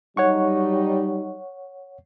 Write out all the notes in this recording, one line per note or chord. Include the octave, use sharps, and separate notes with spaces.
F#3 G3 D#4 C#5 F#5 C#6